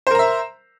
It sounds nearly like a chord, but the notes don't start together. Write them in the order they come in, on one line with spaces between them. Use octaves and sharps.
C5 A#4 A#5 E5